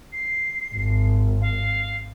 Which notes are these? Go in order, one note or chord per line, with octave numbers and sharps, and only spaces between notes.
C7
G#1
F5